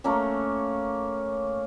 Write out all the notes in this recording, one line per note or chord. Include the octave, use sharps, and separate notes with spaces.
A3 A#3 C#4